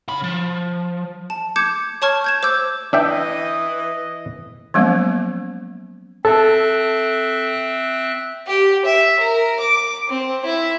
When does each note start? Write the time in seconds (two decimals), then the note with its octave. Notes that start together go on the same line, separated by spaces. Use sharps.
0.08 C#3 B5
0.24 F3
1.30 A5
1.56 D6 G6 G#6 C#7 E7
2.02 C#5 A5 C#6 F6 G#6
2.24 G6 G#6 E7
2.43 C5 D6 E6 G6
2.93 E3 D4 D#5 E5 G5
4.74 F3 F#3 G#3 A#3 B3 C#4
6.25 C4 A4 E5 F#6
8.47 G4
8.85 E5
9.19 A#4
9.60 D6
10.10 C4
10.45 E4